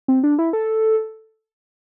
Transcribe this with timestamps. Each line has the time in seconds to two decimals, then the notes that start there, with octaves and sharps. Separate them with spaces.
0.08 C4
0.24 D4
0.39 E4
0.53 A4